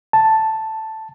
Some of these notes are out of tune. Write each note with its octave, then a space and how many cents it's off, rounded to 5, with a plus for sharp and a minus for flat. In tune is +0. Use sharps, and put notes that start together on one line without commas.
A5 +0